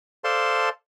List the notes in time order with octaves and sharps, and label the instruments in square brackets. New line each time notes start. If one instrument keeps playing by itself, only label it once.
[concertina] A4 C5 D5 F5 A5 C6